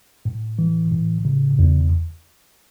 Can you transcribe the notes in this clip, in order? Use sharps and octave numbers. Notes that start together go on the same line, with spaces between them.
A2
E3
A2
C#3
E2